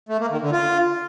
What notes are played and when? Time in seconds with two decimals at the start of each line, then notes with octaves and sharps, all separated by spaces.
0.09 A3
0.20 A#3
0.30 D#3
0.41 D3
0.52 F4